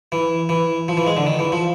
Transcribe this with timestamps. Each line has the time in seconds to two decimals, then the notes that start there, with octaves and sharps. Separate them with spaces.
0.12 E3
0.49 E3
0.88 F3
0.97 E3
1.07 G#3
1.17 D3
1.26 D#3
1.39 E3
1.52 F3